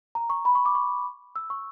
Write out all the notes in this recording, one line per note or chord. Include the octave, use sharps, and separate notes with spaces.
A#5
C#6
B5
C#6
D6
C#6
E6
C#6